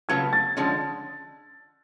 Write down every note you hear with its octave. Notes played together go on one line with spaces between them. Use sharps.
C#3 F#3 A3 F4 B4 G#6
A6
D3 F3 G#3 C#4